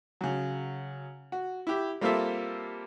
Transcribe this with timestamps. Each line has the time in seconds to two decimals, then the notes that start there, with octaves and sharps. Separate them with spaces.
0.21 C#3 F#3
1.32 F#4
1.67 E4 G4
2.01 G3 A#3 C4 F4 A4 E5